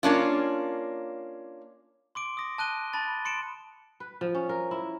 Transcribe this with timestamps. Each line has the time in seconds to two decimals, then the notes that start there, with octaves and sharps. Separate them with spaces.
0.03 A#3 C#4 D4 F4
2.15 C6 D6 D7
2.37 D#6 A#6
2.58 A5 F#6 D#7 G7
2.93 A5 B5 A6
3.25 C6 C#7 D7 E7
4.00 B4
4.21 F3
4.35 C#4
4.49 A#4
4.71 E4